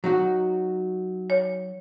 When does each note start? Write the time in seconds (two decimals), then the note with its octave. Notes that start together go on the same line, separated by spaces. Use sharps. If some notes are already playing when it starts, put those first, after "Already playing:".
0.04 F#3 D#4 F#4
1.30 C#5